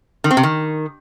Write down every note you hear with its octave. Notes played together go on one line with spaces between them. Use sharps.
D#3
C4
C3
D#3